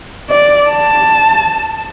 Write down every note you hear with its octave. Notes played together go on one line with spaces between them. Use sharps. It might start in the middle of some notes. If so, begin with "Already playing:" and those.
D5
A5